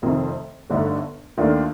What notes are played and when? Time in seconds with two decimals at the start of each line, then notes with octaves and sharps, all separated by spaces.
0.02 F1 F2 C3 D#3
0.70 G1 G2 D3 A3 D#4
1.38 D#2 D#3 A3 D4 F4